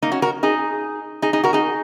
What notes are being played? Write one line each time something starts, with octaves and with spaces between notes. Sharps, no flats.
A#3 D#4
C#4 F#4
F#4 A#4
D#4 G#4
D#4 G#4
D#4 G#4
F#4 A#4
D#4 G#4